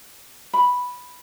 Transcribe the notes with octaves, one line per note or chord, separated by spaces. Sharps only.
B5